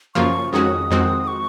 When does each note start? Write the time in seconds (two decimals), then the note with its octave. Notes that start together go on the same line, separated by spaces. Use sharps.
0.15 F#2 C#3 F3 A#3 F4 C#6
0.53 F2 D#3 G#3 C#4 F#4 D#6
0.91 F2 D#3 G#3 C4 F#4
1.27 C#6